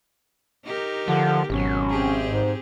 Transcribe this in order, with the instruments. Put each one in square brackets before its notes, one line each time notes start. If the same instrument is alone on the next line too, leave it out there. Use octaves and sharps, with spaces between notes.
[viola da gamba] D#4 G4 A#4
[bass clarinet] D3 [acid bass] F3
[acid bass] G#1 [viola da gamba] B2 F#3 [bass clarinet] C#4
[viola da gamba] C4 G4 G#4
[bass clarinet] G#2